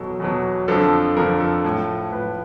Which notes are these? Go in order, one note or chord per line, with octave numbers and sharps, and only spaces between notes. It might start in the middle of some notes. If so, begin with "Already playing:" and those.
Already playing: E2 B2 F#3 A4
E2 B2 F#3
F2 D3 F3 A4
F2 D3 F3 A#4
A4
A2 F3
A2 F3 B4